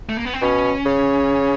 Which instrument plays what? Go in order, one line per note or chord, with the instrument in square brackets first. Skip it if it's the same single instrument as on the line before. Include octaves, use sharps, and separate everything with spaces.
[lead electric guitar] A3
A#3
B3
C4
[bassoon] B2 [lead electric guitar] C#4
[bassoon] C#3